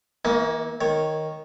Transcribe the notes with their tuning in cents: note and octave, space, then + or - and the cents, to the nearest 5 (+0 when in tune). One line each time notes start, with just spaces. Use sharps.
E3 -30 A#3 +10 D#4 +30
D#3 +0 C#5 -10